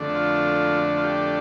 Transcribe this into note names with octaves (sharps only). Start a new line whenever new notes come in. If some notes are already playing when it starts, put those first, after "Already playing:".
Already playing: F2 D3 A3 D4
F4
F4
G4